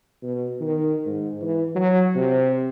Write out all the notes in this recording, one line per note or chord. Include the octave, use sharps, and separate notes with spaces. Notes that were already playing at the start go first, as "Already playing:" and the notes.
B2
D#3
G#2
E3
F#3
C3